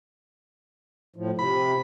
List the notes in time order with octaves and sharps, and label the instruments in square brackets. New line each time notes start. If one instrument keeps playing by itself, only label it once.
[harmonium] A2 F3
[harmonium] C3 [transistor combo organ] B5